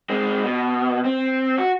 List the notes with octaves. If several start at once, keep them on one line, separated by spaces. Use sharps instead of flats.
G#3 C4
B2
C4
F#4